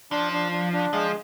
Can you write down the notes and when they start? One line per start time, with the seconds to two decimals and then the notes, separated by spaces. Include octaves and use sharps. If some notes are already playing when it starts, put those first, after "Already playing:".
0.11 F3 D4
0.33 D4
0.52 D4
0.73 D4
0.93 F3 G#3